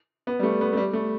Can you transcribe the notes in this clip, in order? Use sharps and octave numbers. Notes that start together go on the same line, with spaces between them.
B3
G3
A3
B3
A3
G3
A3